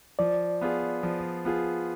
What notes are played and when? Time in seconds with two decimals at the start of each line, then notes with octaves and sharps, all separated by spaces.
0.19 F3 D5
0.61 B3 F4 G#4
1.03 F3
1.45 B3 F4 G#4